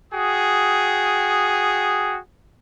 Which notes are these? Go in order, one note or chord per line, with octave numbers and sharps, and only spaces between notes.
F#4 G#4 G5 D#6